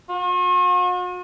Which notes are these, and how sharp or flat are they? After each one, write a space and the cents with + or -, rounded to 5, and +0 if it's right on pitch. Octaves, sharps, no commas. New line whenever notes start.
F#4 -45